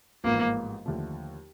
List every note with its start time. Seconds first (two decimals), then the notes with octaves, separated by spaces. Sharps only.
0.24 A1 G#2 F3 G#3 A#3 B3
0.86 D#2 D3 F3 A3